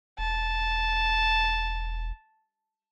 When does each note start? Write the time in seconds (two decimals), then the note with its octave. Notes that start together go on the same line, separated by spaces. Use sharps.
0.18 E1 A5